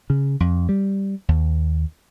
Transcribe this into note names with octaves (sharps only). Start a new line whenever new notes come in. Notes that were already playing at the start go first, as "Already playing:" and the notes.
C#3
F2
G3
D#2